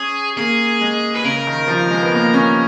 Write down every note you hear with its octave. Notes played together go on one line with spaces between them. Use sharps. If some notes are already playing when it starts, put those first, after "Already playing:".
Already playing: C#4 G#4
A#3 G#4
G#3
B4
C#3 A#4
D#3
F3
G#3
B3
A#3
C#4